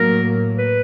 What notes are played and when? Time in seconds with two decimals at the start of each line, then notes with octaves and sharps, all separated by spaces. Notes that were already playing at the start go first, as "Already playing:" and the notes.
Already playing: A2 F#3 A#3 A#4
0.58 B4